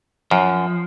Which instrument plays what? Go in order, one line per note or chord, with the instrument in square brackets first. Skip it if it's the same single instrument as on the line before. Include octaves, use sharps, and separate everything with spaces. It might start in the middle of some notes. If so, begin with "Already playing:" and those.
[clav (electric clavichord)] F#2 [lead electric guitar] F3